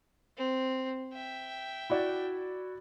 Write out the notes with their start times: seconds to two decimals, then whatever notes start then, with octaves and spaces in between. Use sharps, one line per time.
0.37 C4
1.13 E5 G5
1.90 E4 F#4 D5